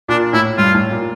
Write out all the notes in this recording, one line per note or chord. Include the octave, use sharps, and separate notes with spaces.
A#2 D4
A2 E4
G2 F4
A2
A#2